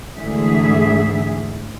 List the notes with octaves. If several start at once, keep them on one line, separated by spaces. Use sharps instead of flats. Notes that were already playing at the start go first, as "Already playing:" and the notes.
D2 G#2 D3 E3 G#4 E5